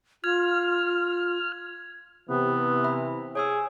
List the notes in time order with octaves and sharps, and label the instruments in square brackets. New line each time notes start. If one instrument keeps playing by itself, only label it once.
[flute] F4 [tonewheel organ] F6 [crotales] G#6
[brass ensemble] C3 E3 [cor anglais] B3
[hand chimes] E5 B5
[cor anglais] G#4 [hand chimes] C#5 G#5 E6